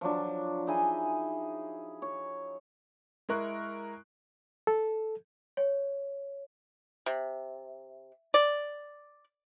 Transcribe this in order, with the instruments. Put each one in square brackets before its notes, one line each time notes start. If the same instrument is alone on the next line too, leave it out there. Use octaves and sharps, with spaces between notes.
[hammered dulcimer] F3 F#3 D4
D#4 E4 G#4 G#5
C#5
[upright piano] G#3 E4 A#4 C#6 F#6
[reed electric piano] A4
[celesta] C#5
[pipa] C3
D5